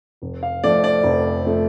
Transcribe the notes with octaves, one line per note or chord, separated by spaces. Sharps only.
F1
F5
F2 F3 A3 D5
D5
F1
F3 A3